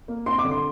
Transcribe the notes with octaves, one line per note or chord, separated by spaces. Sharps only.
A#3
C4 C6
D6
D3
C6